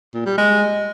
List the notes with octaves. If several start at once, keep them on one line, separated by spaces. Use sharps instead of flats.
A#2
G3
G#3